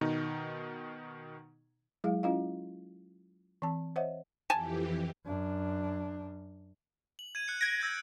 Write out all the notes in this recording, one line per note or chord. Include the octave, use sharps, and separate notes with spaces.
B2 D#3 D#4
F#3 G#3 E4 G#4 F5
C#4 E4 F4 D#5 F5
E3 C4 A5
C5 C#5 D#5 E5 F#5
F2 E3 G4 G#5 A5
F#2 D4
F#7
G#6 D#7
F#6 C#7
G#6 A#6 D7
E6 G6 A6